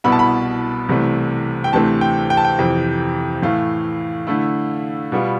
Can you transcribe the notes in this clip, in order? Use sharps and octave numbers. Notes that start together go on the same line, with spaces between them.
C2 B2 B3 E4 B5
A5
B5
C2 C3 E3 A3
G5
D2 C3 E3 A3 C4 A5
G5
G5
A5
G5
F2 C3 E3
A2 E3 A3 F5
D3 A3 E4
B2 G3 B3 F4